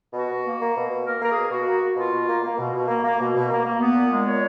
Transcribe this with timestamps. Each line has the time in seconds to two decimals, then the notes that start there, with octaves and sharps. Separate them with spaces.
0.13 B2 F#4
0.29 B2
0.44 A#3
0.60 A#3
0.75 B2
0.90 B2
1.05 A#3 A#4
1.21 A#3 A#4
1.28 G#4
1.36 B2
1.50 B2 F#4
1.66 A#3
1.81 A#3
1.96 B2 F4
2.12 B2
2.27 A#3
2.43 A#3
2.58 B2
2.73 B2
2.88 A#3
3.03 A#3
3.19 B2
3.34 B2
3.50 A#3
3.65 A#3
3.79 B3
3.95 A#2
4.10 G#3
4.26 A#2 C#5